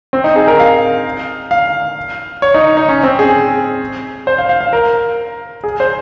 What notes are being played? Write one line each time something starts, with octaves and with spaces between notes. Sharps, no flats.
C4
D#4
G#4
A#4
F5
F5
C#5
D#4
D#4
C#4
C4
G#4
C5
F5
F5
F5
A#4
G#4
C5